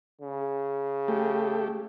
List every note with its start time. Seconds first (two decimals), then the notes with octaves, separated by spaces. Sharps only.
0.21 C#3
1.08 A3 G4